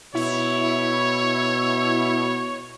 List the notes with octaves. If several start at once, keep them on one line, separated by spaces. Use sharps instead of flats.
B2 E4 C#5